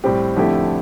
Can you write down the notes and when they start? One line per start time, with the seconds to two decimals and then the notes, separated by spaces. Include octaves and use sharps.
0.04 A2 G3 C4 G4
0.36 F2 D3 A3 E4 G4